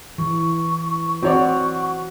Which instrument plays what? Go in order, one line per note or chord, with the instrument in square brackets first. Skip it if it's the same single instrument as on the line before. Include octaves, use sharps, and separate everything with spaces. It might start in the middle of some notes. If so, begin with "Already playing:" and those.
[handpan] E3 [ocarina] C#6
[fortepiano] C4 C#5 D5 [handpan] F#4 [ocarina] C#6